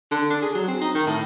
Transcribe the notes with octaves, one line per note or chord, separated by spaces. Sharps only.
D3
D4
G#4
F#3
C4
D#4
D#3
A2